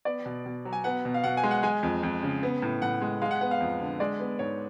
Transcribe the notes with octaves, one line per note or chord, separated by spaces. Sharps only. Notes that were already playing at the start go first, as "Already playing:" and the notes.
B3 D5
B2
B2
F#3
G#5
B3 F#5
B2
F5
B2 F#5
G#5
G#3
F#5
G#3 G#5
F2
F2
C#3
B3
A2
A2 F#5
G#3
G#3 F5
F#5
B3 F#5
F5
F2
D3
G#3 D5
B3
G#2 C#5